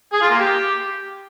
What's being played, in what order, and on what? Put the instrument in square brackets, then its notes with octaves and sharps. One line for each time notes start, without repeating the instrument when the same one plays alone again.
[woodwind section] G#4
F4
A#3
G4